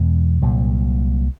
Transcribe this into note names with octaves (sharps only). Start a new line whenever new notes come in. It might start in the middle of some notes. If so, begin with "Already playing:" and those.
Already playing: E2 B2 G#3
C2 A#2 F#3